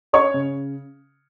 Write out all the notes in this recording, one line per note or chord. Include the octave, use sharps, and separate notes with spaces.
C#4 C#5 C#6
C#3